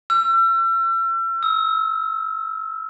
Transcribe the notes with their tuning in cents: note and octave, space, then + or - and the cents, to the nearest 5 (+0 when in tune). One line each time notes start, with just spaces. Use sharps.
E6 +40
E6 -25